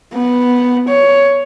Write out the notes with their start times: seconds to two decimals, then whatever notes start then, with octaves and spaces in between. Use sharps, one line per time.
0.14 B3
0.89 C#5